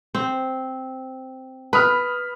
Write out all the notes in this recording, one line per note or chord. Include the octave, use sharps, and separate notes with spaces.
C4
B4 B5 D#6 F6